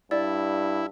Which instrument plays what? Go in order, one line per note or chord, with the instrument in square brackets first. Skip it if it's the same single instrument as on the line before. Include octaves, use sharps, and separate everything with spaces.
[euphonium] G2 [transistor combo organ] E4 [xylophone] D5